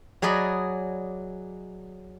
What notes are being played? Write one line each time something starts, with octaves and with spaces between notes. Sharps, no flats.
F#3 G#4 D5 D#5 B5